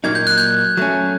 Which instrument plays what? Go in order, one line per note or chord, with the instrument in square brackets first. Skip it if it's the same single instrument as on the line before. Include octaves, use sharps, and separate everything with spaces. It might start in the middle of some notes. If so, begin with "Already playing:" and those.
[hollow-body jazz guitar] A#2 F#3 A#3 D#4 [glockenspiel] G#6
[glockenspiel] G6
F#6
G6
[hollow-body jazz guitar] F#3 A3 C#4